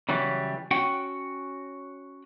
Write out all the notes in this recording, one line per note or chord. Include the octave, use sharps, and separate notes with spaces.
C#3 E3 F#3 G3
C#4 F#4 F#5 G5